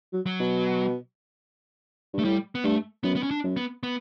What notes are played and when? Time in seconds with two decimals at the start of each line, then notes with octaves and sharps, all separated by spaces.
0.13 F#3
0.26 F#3
0.40 B2
2.14 G2
2.19 A3
2.24 A2 G3
2.55 B3
2.64 G2 A3
3.03 F#2 B3
3.16 B3
3.23 C#4
3.31 D4
3.44 F#2
3.57 B3
3.83 B3